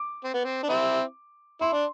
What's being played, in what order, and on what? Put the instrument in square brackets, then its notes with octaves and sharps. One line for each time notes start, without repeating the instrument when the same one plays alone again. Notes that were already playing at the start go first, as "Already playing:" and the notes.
Already playing: [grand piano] D6
[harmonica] C4
B3
C4
D4
C4 E4
[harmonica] E4 [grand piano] C6
[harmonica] D4